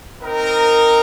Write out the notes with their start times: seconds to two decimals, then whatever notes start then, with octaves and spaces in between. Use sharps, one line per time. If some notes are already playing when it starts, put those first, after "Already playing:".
0.22 C4 D#4 A#4